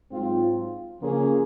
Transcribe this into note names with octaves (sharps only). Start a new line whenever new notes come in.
G#2 F#3 C4 F4
C#3 F3 A#3 C#4 G#4